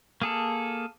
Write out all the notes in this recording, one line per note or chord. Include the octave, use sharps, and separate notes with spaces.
A#3 G#4 A4